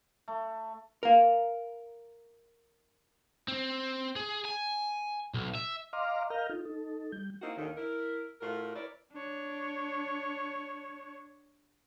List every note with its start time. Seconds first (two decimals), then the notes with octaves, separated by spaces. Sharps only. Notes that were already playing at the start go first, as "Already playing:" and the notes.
0.28 A3
1.03 A#4 F5
3.48 C4
4.16 G#4
4.45 G#5
5.34 B1
5.55 E5
5.93 D#5 F5 A#5 C6 D6 F6
6.30 A#4 D#5 F5 A#5 F6 G6
6.49 D#4 F4 A4
6.65 D#4 A4
7.12 G3 G6
7.42 A#3 C4 D#4 E4 F#4
7.56 D#2 A2 D3 D#3
7.76 E4 A#4
8.41 A2 F4 F#4 A#4
8.75 E4 A#4 B4 C#5 D5
9.13 D4 C#5